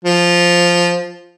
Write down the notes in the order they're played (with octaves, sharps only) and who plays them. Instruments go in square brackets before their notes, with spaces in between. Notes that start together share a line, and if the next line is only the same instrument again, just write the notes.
[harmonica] F3